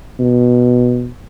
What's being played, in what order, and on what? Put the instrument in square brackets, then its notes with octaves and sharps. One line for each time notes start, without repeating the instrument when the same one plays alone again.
[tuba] B2